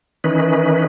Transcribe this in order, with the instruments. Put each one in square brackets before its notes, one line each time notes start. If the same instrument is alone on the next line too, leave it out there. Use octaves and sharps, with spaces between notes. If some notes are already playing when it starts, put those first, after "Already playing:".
[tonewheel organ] D#3 E3 C#4 D#4 B4